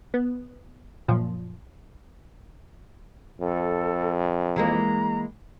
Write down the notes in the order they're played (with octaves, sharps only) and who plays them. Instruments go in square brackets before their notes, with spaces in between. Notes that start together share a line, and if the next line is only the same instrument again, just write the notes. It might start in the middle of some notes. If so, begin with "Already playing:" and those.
[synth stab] B3
F#2 A#2 F3
[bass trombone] F2 [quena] A4
[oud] E3 G#3 A#3 [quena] A#5